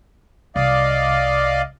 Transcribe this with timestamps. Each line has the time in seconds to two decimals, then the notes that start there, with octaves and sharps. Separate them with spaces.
0.56 C2 D5 D#5 F5